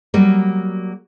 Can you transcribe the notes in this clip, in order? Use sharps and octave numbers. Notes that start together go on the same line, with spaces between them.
F#3 G3 A#3